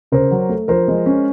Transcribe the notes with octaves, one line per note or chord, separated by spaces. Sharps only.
C#3 A#4 C5
F#3
A3
F3 A#4 C5
G#3
C#4